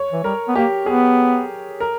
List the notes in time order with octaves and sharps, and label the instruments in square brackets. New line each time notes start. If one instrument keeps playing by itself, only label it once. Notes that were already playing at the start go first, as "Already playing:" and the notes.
Already playing: [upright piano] C#5
[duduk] E3
[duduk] G3 [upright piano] A#4
[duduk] B3
[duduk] A#3 [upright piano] G4
[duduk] B3 [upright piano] G#4
[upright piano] A#4